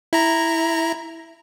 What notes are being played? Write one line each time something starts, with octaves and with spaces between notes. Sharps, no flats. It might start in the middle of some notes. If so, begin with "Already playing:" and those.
E4 A#5